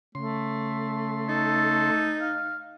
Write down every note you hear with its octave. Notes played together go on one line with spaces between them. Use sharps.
C#3 A3 C6
D#4 A4
F5